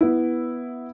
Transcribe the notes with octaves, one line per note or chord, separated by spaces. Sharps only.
B3 E4